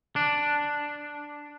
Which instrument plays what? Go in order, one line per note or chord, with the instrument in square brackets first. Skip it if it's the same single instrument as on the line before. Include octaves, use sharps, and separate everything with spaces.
[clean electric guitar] D4